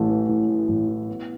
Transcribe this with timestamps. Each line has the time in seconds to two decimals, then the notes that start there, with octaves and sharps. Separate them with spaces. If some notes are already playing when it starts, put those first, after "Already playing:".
Already playing: A1 A2 A3
0.09 E3
0.29 A2
0.49 A3
0.69 A1
0.88 E3
1.08 B3